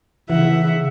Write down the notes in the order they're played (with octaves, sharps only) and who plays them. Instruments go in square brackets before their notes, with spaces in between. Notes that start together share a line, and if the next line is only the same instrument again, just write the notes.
[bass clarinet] C#3 [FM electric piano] E3 [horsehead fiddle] E5 F#5